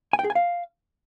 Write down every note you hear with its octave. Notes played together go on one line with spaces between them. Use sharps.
G#5
G5
G#4
G#5
F5